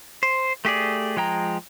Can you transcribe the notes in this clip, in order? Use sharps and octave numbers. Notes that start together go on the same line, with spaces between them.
C5
A3 G4 G#4 D5
F3 G#3 G5 A#5